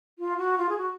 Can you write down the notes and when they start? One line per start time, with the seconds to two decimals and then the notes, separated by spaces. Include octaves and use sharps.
0.18 F4
0.37 F#4
0.57 F4
0.69 G#4
0.77 F#4